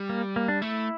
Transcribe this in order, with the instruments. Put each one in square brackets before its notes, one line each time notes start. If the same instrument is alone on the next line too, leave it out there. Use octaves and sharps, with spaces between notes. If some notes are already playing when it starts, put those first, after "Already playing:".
Already playing: [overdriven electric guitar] G3
[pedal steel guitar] A#3
A#3
D4
[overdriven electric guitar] A3 [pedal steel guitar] E4